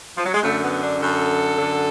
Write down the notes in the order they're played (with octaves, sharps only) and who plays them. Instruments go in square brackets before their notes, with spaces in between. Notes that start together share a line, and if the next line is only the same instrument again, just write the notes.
[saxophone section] F3
F#3
G#3
F#2 D3 A3
B3
D4
F#2 D3 A4
F#2 D3